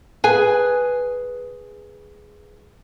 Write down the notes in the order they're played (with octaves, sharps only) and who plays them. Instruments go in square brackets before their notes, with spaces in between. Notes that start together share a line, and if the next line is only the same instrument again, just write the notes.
[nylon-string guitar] G#4 B4 G#5